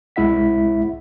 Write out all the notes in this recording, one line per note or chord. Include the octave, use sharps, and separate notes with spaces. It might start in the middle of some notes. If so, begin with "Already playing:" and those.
C2 G#3 E4 E5 F#5 B6